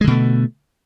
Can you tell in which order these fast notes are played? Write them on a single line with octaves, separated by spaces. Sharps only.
G#3 D3 B2 A3